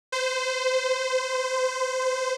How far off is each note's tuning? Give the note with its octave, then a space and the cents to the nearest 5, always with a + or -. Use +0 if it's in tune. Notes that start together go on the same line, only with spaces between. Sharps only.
C5 -25